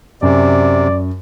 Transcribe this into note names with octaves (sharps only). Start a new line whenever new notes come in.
F#2 C3 D5